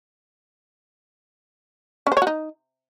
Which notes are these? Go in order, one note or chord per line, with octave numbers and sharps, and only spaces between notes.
C#4
C5
C#5
F#4
D#4